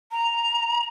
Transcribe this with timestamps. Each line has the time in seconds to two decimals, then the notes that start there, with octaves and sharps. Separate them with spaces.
0.12 A#5